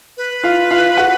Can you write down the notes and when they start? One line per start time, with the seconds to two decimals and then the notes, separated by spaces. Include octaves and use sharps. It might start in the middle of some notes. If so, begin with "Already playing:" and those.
0.17 B4
0.43 F4 F5
0.71 F4 F5
0.97 F#4 F#5